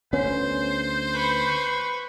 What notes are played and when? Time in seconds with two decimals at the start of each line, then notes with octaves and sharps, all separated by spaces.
0.13 D2 B3 C#4 C5
1.13 B4 C#6